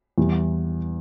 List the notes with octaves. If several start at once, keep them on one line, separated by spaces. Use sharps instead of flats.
E2 E3 G3